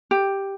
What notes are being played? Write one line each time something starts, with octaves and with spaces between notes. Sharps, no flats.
G4